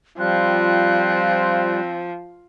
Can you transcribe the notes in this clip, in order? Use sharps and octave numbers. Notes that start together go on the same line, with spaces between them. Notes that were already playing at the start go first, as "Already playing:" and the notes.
F3 G3 C4 F4 F#6